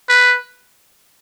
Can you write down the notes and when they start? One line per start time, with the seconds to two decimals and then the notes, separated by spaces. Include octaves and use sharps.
0.09 B4